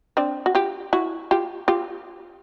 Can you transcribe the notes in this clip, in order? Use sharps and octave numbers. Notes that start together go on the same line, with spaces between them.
C4 D4
F#4
F4 G4
E4 F#4
F4 G4
F4 G4